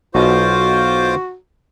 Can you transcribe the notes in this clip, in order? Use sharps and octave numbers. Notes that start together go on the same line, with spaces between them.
B1 B2 F4 F#4 C5 D#5 D6